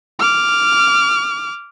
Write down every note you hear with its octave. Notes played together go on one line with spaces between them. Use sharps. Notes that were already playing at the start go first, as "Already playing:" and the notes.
D6 F6